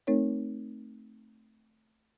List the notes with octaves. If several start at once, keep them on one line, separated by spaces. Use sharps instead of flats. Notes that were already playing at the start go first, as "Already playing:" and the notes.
A3 C4 D#4 A#4 C#5